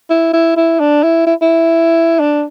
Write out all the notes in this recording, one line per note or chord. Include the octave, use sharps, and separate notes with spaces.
E4
E4
E4
D4
E4
E4
E4
D4